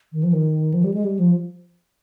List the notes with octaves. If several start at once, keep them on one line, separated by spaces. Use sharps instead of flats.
D#3
F3
D#3
F3
G3
G#3
G3
F3